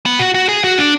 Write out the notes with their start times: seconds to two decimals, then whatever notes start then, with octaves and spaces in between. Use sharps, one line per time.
0.06 B3
0.19 F#4
0.34 F#4
0.49 G#4
0.64 F#4
0.78 D4